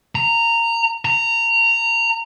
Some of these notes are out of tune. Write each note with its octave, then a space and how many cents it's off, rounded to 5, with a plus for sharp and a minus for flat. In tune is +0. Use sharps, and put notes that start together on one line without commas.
A#5 -15
A#5 -20